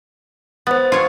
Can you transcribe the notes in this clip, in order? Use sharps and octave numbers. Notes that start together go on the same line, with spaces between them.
B3 C5 A6
F4 C#5